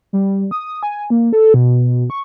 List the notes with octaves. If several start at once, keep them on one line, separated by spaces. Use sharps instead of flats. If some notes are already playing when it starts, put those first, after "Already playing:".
G3
D#6
G#5
A#3
A4
B2
C#6